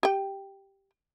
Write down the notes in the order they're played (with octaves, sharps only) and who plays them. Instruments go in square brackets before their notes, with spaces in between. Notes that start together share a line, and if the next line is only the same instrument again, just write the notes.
[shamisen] G4 G5